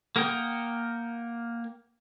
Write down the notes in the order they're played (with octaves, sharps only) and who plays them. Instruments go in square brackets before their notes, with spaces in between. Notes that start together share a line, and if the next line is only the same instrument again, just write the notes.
[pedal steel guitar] A#3 A#4 F#5 G5 D#6